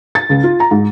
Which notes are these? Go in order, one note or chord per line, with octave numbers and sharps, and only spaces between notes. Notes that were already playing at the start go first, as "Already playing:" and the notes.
A6
C#2
F4
A#5
G#2